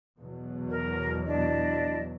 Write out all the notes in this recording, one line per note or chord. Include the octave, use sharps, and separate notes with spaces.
E2 B2 F#3
A#4
D4 E4 D#5